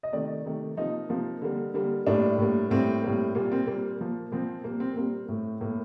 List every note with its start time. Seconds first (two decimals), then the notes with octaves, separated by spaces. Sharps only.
0.03 D#5
0.13 C3 D#3 A3 D5
0.45 C3 D#3 A3
0.77 C3 F3 A#3 D#4
1.09 C3 F3 A#3
1.42 D3 G3 A#3
1.74 D3 G3 A#3
2.07 A2 G3 A#3 D4
2.38 A2 G3 A#3
2.71 A2 G3 A#3 C4
3.03 A2 G3 A#3
3.35 A#2 G3 A#3
3.52 C4
3.67 A#2 G3 A#3
3.99 A#2 F3 A#3
4.32 A#2 F3 A#3 C4
4.64 A#2 G3 A#3
4.80 C4
4.96 A#2 G3 A#3 C4
5.29 A2 A3
5.61 A2 A3 A#3